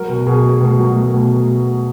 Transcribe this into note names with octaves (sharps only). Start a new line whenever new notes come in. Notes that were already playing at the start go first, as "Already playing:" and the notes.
Already playing: F#3 A#4
B2
B2 G#4
A3
B2
F#3
A3
B2